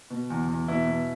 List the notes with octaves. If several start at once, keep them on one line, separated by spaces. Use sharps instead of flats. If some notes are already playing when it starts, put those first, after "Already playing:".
B2
E2
E2
B2 E4
B2